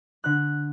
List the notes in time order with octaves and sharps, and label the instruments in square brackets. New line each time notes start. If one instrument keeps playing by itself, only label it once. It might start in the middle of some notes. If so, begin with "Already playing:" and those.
[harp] D3 F#6